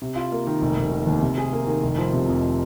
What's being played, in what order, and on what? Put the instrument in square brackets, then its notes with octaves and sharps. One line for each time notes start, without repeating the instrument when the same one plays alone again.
[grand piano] C3
F4
A#3
D#3
F1
F1
D#3
D#2
C3
G#4
A#3
D#3
F1
F3
C3
F2